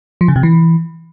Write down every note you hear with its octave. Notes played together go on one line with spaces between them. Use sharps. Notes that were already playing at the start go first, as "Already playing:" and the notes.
F3
C#3
C3
E3